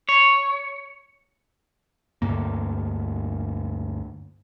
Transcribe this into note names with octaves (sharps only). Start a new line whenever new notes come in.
C#5
D2 G2 A#3